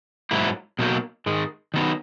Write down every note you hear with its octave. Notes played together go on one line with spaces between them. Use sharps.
G#2 F#3 A#3 E4
B2 F#3 A#3 D#4
G#2 D#3 G#3
D#3 F#3 B3 D#4